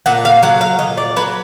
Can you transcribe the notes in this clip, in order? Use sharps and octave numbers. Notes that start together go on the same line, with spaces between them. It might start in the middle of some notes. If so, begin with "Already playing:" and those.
A#2 F#5
F5
F#3 F#5
F5
A#2 D#5
D5
F#3 B4